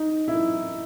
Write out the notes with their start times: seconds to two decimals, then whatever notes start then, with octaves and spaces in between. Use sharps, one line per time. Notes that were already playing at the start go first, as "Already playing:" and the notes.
Already playing: D#4
0.28 E4